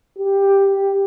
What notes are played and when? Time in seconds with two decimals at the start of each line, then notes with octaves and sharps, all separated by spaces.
0.19 G4